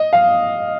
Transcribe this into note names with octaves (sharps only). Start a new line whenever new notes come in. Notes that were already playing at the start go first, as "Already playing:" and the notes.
Already playing: D#5
F5